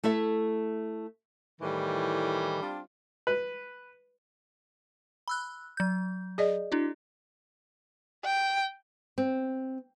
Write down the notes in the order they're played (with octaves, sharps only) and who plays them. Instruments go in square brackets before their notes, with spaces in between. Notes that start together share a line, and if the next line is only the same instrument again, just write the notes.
[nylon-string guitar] A3 E4 A4 E5
[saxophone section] A2 D#3 E3 [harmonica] G3
[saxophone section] C4 D4 F4
[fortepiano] B4
[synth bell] B5 E6 F#6
F#3 G6
[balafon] G#4 D5 D#5
[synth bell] D4 E4 F#4
[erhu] G5
[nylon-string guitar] C4